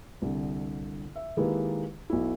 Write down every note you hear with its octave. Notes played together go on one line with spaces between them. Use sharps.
C2 D3
E5
D#3 G#3 A#3 E4 G4 B4
B1 E4